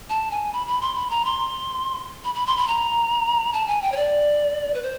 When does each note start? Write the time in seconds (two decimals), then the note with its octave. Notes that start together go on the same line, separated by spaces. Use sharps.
0.10 A5
0.31 G#5
0.53 B5
0.67 B5
0.81 C6
0.95 B5
1.10 A#5
1.25 C6
2.24 B5
2.35 B5
2.46 C6
2.57 B5
2.68 A#5
3.53 A5
3.67 G#5
3.82 G5
3.92 C#5
3.96 D5
4.74 B4
4.83 C5